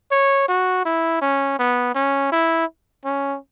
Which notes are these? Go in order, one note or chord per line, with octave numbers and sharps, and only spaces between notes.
C#5
F#4
E4
C#4
B3
C#4
E4
C#4